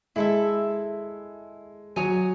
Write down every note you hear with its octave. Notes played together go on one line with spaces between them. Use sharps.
G#3 E4 A4 E5
F#3 C#5 G#5 D#6